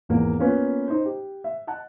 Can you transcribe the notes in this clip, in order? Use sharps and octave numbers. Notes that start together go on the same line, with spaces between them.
G#1 E2 A#3
A#3 B3 C#4 F4 B4
D#4 C5
G4
E5
D#5 F#5 A5 F#6